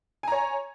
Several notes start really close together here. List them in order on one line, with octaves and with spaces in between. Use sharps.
G#5 A#5 C#5